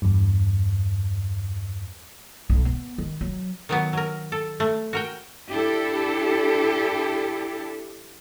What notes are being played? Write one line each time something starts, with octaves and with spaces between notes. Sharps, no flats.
E2 G2
B1
B3
D#3
F#3
D#3 F#3 B3
F#3 A#4
A4
A3
F#4 A#4 G5
D4 E4 G4 A4